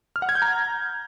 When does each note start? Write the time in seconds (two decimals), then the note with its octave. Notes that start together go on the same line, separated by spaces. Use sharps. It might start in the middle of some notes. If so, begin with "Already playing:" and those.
0.16 F6
0.22 F#5
0.29 G#6
0.35 G6
0.42 A#5